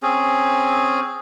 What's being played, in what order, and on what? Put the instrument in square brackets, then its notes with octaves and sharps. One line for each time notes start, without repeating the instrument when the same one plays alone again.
[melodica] C4 C#4 G#4